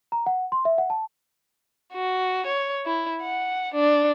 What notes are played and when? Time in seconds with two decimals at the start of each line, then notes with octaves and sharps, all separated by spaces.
0.12 A#5
0.26 F#5
0.52 C6
0.65 E5
0.78 F#5
0.90 A5
1.93 F#4
2.46 C#5
2.86 E4
3.21 F#5
3.74 D4